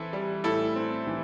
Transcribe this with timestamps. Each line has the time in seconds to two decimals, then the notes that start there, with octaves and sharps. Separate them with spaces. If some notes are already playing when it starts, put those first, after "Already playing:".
Already playing: E3 C4 E4 A4
0.13 G3
0.44 A2 E4 A4
0.76 C4
1.07 E3